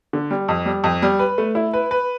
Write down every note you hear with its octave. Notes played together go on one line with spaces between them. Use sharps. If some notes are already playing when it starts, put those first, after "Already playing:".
D3
G3
F2
G3
F2
G3
B4
A3
E4
B4
B4